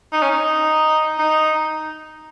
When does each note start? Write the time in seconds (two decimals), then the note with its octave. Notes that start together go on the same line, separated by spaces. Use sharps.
0.12 D#4
0.22 C#4
0.31 D#4
1.18 D#4